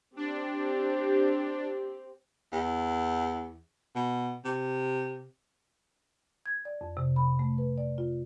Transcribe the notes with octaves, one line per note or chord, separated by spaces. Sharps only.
C4 D4 G4
E2
B2
C3
G#6
D5
F2
C3
B5
A3
B4
D5
F4